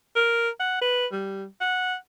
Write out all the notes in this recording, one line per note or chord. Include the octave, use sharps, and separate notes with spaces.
A#4
F#5
B4
G3
F#5